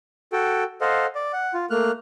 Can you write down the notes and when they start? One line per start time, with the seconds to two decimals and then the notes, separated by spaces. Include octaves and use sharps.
0.33 F#4 A4 G5
0.81 A4 C5 D#5 F5 F#5
1.15 D5
1.33 F#5
1.54 F4
1.70 A3 A#3 F6 F#6